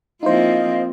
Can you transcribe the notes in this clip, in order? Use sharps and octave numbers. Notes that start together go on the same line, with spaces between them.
F3 A#3 C4 D#4 E4 C5 D#5 F5